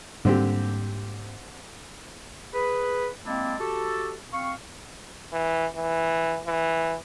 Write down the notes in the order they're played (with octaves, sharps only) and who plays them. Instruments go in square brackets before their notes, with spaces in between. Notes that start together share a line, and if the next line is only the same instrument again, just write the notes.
[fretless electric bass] G#2 G3 A#3 [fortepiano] D3 C4 G4
[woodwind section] G#4 B4
G#3 A#3 C4 D4 E4
F#4 G4 A4
C4 F5 C#6
[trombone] E3
E3
E3